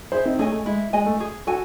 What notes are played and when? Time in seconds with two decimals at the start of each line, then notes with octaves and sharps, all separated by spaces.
0.12 E4 G#4 C5
0.25 C4 D#4
0.39 A3 C#4 G#4 D#5 G#5
0.52 A3
0.66 G#3 E4
0.93 G#3 G#4 D#5 G#5
1.06 A3
1.20 G#4
1.47 F#4 A4 G#5